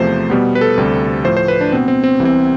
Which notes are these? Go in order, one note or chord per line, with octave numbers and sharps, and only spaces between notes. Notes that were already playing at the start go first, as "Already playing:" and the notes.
Already playing: E2 C3 F3 A3 C5
B2 G3 B3
B4
A4
D2 C3 G3
A2 F3 A3 C5
C5
B4
D4
B2 B3 C4
C4
C4
C2 C3 E3 B3
C4